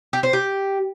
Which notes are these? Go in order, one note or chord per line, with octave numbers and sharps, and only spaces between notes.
G4
C5
G4